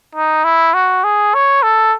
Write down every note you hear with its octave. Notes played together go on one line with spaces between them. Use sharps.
D#4
E4
F#4
G#4
C#5
A4